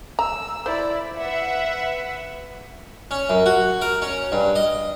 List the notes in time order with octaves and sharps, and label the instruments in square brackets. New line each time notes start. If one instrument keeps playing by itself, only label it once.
[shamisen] A#5 [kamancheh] E6
[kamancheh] E4 D5 [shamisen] C5
[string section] B4 E5 F#5
[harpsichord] C#4
F#2
F#4
A#4
C#4
G2
D#5